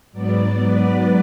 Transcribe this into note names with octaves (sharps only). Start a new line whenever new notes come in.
G#2 F#3 B3 D5
B4